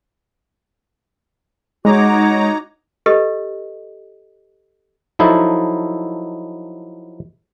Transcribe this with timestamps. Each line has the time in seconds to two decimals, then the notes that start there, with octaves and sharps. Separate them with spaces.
1.85 G#3 D#4 F#4 C#5 A#5 D6
3.06 G4 A4 B4 D#5
5.19 F3 F#3 D#4 E4 A4